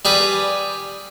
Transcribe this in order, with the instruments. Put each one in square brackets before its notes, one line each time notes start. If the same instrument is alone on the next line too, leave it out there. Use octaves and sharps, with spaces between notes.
[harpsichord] G3 G#4 B4